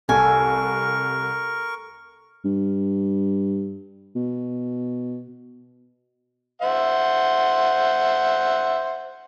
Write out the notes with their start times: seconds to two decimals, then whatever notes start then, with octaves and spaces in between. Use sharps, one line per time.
0.09 C2 A4 A#4 G#5 C#6
2.45 G2
4.15 B2
6.62 C5 E5 F#5